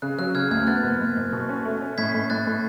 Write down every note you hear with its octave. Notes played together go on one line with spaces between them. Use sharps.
C#3 F#6
F#3 F#6
C#3 F6 G#6
D2 F6 G#6
B3 F#6 A6
F#1
F#1
F#1
B2
C#4
A3
C#4
A2 G#6 B6
A2
A2 F#6 A6
A2